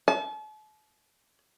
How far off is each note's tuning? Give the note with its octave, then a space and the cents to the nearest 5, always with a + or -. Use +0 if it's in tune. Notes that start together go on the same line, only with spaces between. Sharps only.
A5 -40